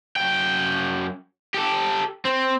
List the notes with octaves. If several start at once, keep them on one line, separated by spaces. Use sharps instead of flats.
F#2 G5
G4 A4
C4